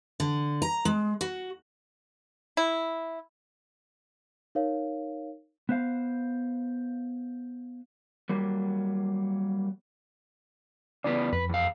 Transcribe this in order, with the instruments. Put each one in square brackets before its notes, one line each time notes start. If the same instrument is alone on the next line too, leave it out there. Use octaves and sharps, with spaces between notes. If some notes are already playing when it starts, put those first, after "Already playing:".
[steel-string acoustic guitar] D3
A#5
G#3
F#4
[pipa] E4
[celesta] D#4 A#4 C#5 F5
[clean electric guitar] B3 C5 F5
[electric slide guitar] F#3 G3 A#3
[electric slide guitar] C#3 E3 B3 [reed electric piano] D5
[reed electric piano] F2 [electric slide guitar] B4
[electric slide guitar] E2 F5